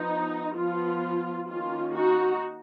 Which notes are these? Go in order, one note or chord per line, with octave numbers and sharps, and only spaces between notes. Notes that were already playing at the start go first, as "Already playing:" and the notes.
Already playing: F3 B3 D#4
F3 B3 F4
D#3 A#3 C#4 F4
D#4 F#4